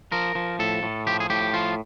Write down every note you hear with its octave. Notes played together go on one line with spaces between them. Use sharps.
F3 A#4
F3
A2 A4
A2
F3 G4
G#4
A2 G4
F3 F4